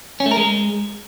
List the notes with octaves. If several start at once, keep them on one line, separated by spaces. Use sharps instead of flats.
C#4
A3
A#4
G#3